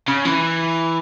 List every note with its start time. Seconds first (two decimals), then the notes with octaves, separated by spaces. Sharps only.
0.08 C#3
0.25 E3